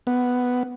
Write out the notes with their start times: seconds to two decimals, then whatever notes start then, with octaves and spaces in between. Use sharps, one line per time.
0.07 B3